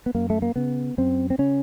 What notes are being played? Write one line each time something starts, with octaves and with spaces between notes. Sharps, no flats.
B3
F#2 A#3
A3
A#3
C#3 B3
F#2 C4
C4
C#3 C#4